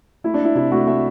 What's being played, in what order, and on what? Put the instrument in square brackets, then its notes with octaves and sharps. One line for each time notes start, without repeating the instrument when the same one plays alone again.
[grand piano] A3 E4
D4
A3 E4
C3 E4
A3 F#4
A3 E5